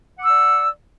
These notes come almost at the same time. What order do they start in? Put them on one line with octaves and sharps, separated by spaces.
F#5 D6 E6 D5